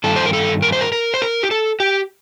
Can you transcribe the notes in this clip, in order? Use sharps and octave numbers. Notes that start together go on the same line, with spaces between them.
G2 D#3 A4
C5
A#4
A4
A#4
C5
A#4
A#4
C5
A#4
G4
A4
G4